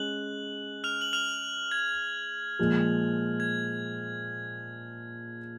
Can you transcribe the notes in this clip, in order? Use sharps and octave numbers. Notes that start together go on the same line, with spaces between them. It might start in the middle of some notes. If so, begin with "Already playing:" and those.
Already playing: G#3 C#4 F#6 F#7
F6 F7
F#7
F6 F7
G#6
A#2 F3 G#3
G#6